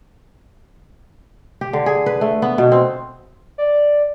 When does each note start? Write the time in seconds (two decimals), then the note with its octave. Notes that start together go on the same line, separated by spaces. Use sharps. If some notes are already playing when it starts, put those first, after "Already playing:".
1.61 G4
1.73 D3
1.86 G#4
2.06 B4
2.21 A3
2.42 B3
2.58 B2
2.72 C4
3.58 D5